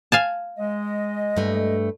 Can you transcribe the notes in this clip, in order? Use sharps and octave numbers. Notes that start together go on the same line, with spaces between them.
F5 G#5 A5
G#3 D#5
G2 A3